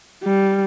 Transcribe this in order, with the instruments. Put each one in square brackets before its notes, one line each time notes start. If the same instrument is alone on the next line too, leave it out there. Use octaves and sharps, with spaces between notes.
[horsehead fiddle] G3